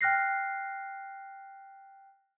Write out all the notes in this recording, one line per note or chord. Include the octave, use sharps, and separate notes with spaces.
G5 F6 F#6 A#6 C7